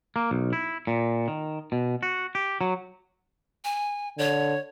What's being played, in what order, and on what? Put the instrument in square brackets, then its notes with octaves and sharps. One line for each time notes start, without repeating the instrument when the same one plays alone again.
[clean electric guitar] A#3
B1
E4
A#2
D#3
B2
F#4
G4
F#3
[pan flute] G#5
[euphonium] D3 [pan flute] C#5